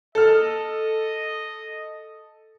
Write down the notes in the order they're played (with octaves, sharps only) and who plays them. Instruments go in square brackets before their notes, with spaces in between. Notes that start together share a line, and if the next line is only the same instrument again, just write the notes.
[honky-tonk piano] A4 F6 [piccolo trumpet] D#5